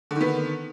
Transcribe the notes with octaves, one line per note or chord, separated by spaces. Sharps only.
D3 D#3 B3